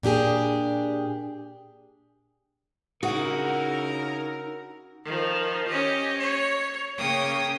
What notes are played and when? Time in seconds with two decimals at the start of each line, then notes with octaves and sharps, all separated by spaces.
0.03 A#2 D4 G4 G#4
3.03 C#3 D#4 E4 F#4 G#4 A#4 F#5
5.05 D#3 F3
5.68 C#4 G4 D#5
6.17 C#5
6.98 C#3 A#3 C#5 G5 D#6